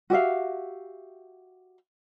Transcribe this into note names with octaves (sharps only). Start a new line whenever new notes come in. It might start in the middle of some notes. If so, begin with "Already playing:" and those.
F#4 G4 E5 F5